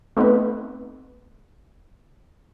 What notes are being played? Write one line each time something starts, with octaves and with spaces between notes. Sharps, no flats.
A3 B3 C4 D#4 B4